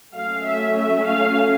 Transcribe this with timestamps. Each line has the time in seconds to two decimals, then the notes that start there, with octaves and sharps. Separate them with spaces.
0.15 F#3 A3 C#4 F5
0.45 E5
0.76 E5
1.06 F5